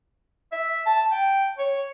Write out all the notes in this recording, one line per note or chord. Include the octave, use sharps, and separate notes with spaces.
E5
A5
G5
C#5